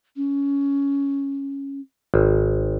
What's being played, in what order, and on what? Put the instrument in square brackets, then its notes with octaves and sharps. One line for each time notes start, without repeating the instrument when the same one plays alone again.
[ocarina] C#4
[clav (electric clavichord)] G#1